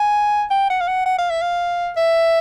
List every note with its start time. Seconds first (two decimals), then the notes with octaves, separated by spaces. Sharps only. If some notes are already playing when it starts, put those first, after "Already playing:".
Already playing: G#5
0.50 G5
0.70 F#5
0.81 F5
0.88 F#5
1.06 F#5
1.18 F5
1.30 E5
1.42 F5
1.97 E5